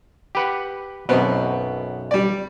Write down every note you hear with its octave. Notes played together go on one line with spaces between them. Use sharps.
G4 B4 F#5
B1 F#2 B2 B3 C4
G3 D5